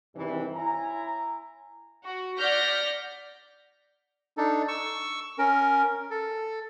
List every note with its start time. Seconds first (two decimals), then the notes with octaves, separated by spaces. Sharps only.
0.15 E2 G2 C3 D#3 E3
0.54 E4 C#5 G#5 A#5
2.04 F#4
2.38 D5 F#5 F6 G6 A#6 B6
4.37 D4 D#4 A4
4.68 C#6 E6
5.38 C#4 A#4
6.11 A4